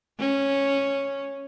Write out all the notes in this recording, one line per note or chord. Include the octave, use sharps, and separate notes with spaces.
C#4